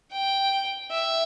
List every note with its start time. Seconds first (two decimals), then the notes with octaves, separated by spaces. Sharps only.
0.12 G5
0.91 E5